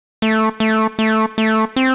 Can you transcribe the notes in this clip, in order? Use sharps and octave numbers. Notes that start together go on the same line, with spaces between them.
A3
A3
A3
A3
C4